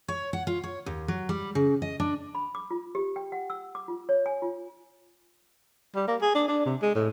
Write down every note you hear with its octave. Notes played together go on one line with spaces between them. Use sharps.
C#5
F#5
F4
C#5
D#2
F#3
G3
C#3
D#5
D4
B5
D6
F4
G4
G5
F#5
E6
D6
F4
C#5
G#5
F4
G3
A#3
G#4
D4
D4
C3
G#3
A2